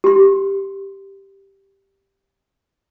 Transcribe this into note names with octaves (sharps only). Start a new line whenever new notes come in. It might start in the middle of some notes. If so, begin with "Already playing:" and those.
G4 C6